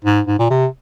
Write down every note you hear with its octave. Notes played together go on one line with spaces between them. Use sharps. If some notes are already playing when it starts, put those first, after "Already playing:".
G#2
G#2
A#2
C3